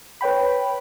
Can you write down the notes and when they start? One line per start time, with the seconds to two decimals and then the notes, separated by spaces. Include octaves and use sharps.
0.21 B4 C#5 G5 B5